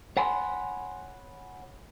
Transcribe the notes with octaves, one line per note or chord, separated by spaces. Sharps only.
C#5 F#5 G#5 B5 C6